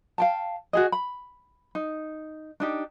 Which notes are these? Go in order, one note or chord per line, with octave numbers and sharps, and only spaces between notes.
F5 G5 A5
F#4 G#4 D#5
B5
D#4
D4 D#4 G4